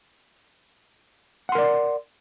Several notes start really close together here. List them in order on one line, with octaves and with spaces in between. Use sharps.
F#5 C6 A#4 D5